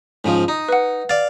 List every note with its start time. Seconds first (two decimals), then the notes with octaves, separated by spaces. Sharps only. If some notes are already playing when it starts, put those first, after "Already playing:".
0.25 G#2 C#3 F3
0.48 D#4
0.69 B4 F#5
1.09 D5 F5 A6